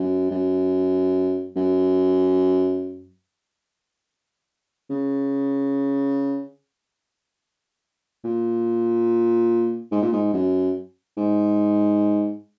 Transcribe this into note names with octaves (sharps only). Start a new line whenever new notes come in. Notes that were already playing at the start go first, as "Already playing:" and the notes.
Already playing: F#2
F#2
F#2
C#3
A#2
G#2
A#2
G#2
F#2
G#2